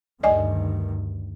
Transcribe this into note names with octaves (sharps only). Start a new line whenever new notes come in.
D2 G2 D#3 D5 D#5 G#5